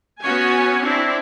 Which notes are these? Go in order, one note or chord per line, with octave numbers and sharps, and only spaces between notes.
B3 C#4 F#4 C#5 G#5
C4 D4 E4